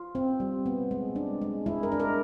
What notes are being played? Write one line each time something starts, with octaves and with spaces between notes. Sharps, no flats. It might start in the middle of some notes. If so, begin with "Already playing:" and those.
Already playing: F4
C4
G3
B3
G#3
D4
G#3
G#3 E4
A#4
D4
A#4